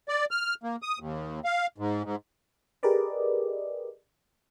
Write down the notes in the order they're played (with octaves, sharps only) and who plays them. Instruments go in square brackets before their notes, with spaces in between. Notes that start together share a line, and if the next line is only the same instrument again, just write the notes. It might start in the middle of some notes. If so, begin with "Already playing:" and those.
[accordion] D5
F6
A#3
D#6
D#2
F5
G#2
G#2
[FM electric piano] G4 G#4 A#4 B4 D5 D#5